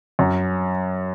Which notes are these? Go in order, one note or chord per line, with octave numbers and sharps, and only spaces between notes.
F#2